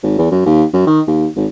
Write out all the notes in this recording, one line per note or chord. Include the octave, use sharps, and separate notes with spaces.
G#1
E2
F#2
D#2
F#2
D#3
D#2
G#1